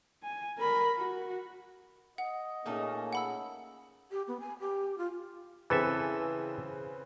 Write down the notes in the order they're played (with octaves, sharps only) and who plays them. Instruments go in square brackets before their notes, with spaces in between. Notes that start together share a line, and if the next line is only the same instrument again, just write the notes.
[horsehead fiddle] G#5
A#4 B5
F#4
[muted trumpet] D#5 [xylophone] F#5
[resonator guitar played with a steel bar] A#2 A3 D#4 [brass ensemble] A#3 C#4 G#4
[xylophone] F#5 B5 E6
[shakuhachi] G4
B3
G#5
G4
F4
[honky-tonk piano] C#3 C4 B4 [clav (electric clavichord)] E3 A4 E5